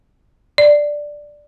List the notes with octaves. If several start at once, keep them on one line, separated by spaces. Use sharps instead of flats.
D5